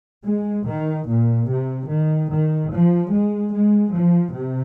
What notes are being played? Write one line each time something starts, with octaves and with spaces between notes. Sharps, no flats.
G#3
D#3
A#2
C3
D#3
D#3
F3
G#3
G#3
F3
C3